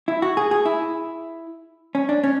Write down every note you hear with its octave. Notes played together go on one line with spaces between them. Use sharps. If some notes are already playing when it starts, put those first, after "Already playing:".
E4
F#4
G#4
G#4
E4
C#4
D4
C#4